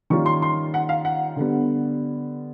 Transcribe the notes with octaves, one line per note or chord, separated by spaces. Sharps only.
D#3 G3 A#3 C#4 F4 C#6
C6
C6
F#5
F5
F#5
D3 G3 B3